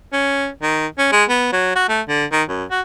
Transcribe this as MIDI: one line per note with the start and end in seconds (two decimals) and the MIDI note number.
0.13 0.49 61
0.63 0.87 51
0.98 1.11 61
1.12 1.24 56
1.29 1.48 59
1.52 1.71 54
1.75 1.87 66
1.89 2.01 57
2.09 2.25 50
2.32 2.43 51
2.49 2.64 42
2.71 2.81 66